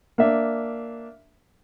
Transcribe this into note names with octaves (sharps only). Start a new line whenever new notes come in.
A#3 D4 E5